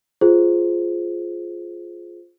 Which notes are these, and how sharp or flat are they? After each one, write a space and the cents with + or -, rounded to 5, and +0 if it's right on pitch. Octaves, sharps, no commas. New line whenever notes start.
F4 +0 G#4 +15 C5 +0